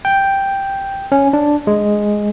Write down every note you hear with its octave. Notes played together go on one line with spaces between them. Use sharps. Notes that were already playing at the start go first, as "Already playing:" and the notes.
G5
C#4
D4
G#3